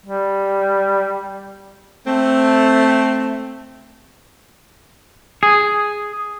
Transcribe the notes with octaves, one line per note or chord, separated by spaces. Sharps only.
G3
A3 C4
G#4